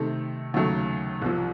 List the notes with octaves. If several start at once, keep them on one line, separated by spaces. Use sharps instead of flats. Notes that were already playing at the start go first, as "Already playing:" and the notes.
Already playing: C3 D#3 A3
D#2 C#3 F#3 A3
C2 C3 F3